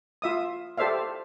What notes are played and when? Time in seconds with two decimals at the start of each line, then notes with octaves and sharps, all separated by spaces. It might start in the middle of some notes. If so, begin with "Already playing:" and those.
0.22 F4 E5 D#6
0.78 G4 A4 C5 D5 E5 F5